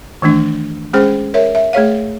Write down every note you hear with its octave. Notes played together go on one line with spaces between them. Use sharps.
D#3 E3 A3 D4
G#3 C#4 G#4 C5 G5
A#4 C#5 E5
E5
A3 G#4 C#5 F5